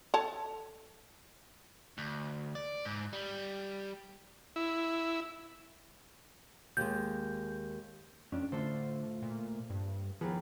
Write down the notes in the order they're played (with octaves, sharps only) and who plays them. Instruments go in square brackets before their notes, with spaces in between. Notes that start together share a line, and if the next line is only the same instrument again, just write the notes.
[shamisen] A4 C#5 A5
[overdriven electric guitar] D2
D5
G#2
G3
[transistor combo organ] E4
[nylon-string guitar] D#2 G#3 [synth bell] G6
[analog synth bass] F2 [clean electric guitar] C#4 D4
[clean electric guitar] A2 F4 [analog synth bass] D3 [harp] A4 C5
[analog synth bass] A#2
G2
[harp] D#2 G#4 [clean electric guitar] F3 [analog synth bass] B3